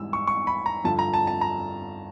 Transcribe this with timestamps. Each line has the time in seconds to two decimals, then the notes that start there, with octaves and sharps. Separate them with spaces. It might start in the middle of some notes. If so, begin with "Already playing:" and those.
Already playing: G#2 E3 G3 E6
0.13 C#6
0.27 C#6
0.47 B5
0.66 A#5
0.84 G2 D3 F3 A5
0.99 A#5
1.14 A5
1.27 A5
1.41 A#5